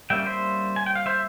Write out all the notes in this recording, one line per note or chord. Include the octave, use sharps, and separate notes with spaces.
G3 A#3 C#4 E5 G5
C5 E5
G#5
G5
F5
C5 E5